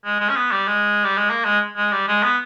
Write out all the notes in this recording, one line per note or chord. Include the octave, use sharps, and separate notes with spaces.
G#3
G#3
C#4
B3
G3
G#3
G3
G#3
A#3
G#3
G#3
G3
G#3
B3